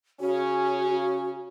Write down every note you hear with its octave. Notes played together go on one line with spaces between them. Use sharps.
C#3 C#4 F#4